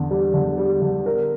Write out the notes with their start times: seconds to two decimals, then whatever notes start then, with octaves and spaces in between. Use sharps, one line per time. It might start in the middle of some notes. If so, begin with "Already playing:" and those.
Already playing: E2 D3
0.11 G3
0.34 D3
0.58 G3
0.82 D3
1.06 A#4